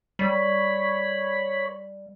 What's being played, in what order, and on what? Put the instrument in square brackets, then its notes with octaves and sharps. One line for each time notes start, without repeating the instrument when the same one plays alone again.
[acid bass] G3 [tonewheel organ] C#5 B5